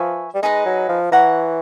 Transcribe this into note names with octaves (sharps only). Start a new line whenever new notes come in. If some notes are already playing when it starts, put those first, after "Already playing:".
Already playing: F3 B4 E5 G#5 C#6
G3
G#3 D#4 G#4 B4 D#5
F#3
F3
E3 C#5 F#5 A#5